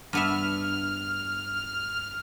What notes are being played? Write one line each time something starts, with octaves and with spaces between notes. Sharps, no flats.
G2 B3 E5 F6